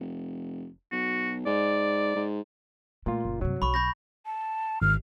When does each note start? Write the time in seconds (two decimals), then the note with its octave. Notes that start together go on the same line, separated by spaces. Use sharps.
0.01 F1
0.92 B1 F#4
1.46 G#2 D5
2.15 G#2
3.06 A#2 A3 F4
3.25 F#1
3.41 G2 C3 F#3
3.62 B1 B5 C#6
3.74 B5 G6 A#6
4.26 A5
4.82 G#1 F6